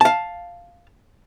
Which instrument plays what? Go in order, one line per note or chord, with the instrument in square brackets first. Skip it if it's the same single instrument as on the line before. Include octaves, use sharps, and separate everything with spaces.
[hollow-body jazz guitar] F5 A5